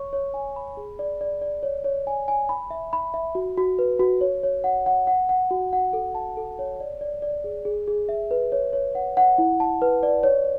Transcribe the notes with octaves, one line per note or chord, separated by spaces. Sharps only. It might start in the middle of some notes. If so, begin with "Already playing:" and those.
Already playing: C#5 C#6
C#5
G#5
B5
G#4
D5
D5
D5
C#5
C#5
G#5
G#5
B5
E5
B5
E5
F#4
F#4
B4
F#4
C#5
C#5
F#5
F#5
F#5
F#5
F#4
F#5
A4
A5
A4
C#5
D5
D5
D5
G#4
G#4
G#4
E5
B4
C#5
C#5
F#5
F#5
E4
A5
B4
D5
C#5